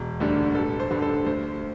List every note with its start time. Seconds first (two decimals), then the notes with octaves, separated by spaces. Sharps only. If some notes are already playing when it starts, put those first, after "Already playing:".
Already playing: E1
0.20 D2 D3 G3
0.55 A1 A4
0.80 C5
0.90 G2 D3 G3
1.02 A4
1.26 D2 C5